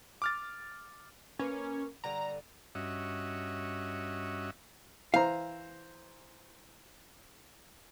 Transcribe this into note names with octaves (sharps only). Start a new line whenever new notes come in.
D6 F6 A6
A#3 C#4 A#4 B4
G2 D3 G3 A#5
G2 C#4 F#4 D#5 E5
E3 C5 F5 A#5